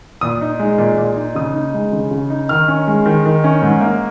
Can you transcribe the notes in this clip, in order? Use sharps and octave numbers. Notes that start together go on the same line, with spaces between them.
A#2 D#6
D#4
G#3
A#2
A#2
D#4
C#3 D#6
D#4
G#3
C#3
C#3
D#4
D#3 F6
C#4
G#3
D#3
D#3
C#4
G#2
A#3